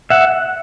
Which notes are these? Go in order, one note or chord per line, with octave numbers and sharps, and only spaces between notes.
E5 F#5